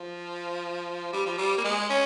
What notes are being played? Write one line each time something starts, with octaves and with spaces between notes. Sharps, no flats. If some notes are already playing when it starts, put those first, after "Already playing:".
Already playing: F3
G3
F3
G3
A#3
G#3
C#4